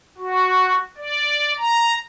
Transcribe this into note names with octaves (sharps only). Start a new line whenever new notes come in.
F#4
D5
A#5